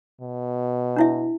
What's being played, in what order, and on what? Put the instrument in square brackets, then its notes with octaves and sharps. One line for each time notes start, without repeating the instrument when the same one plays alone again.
[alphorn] B2
[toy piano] D4 E4 E5